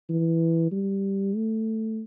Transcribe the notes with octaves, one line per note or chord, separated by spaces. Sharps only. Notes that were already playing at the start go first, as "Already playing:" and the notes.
E3
G3
A3